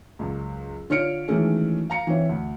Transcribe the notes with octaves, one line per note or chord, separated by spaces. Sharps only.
C#2 F#2
D3 F4 C#5 F6 C#7 D7
D#3 E3 F#3 G#3 A3 C#4
F5 A#5 C#7
E3 C4 E4 C#5
D2